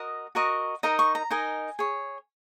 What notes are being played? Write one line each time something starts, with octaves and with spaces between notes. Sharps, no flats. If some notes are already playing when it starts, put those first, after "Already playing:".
Already playing: F#4 A#4 D#5 D#6
F#4 A#4 D#5 C#6
D#4 A#4 D#5 A#5
C#6
A#5
D#4 A#4 D#5 G#5
G#4 C#5